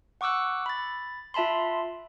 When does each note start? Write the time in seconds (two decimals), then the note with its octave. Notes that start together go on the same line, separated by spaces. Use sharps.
0.21 F#5 C#6 D6 E6 F#6
0.66 B5 A6
1.34 F4 E5 A5 B5 C6